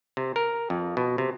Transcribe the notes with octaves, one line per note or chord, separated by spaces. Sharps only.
C3
A#4
F2
B2
C3